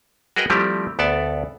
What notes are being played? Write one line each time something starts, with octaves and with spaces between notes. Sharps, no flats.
F#4 G#4 A#4 B4 D#5 G5
F3 G3 A3 C4 E4 G4
D2 B3 A4 D5 A5